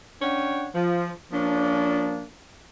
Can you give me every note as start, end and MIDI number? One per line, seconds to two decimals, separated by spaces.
0.21 0.68 61
0.21 0.68 62
0.21 0.68 73
0.21 0.68 78
0.21 0.68 79
0.74 1.12 53
1.32 2.26 53
1.32 2.26 58
1.32 2.26 61
1.32 2.26 62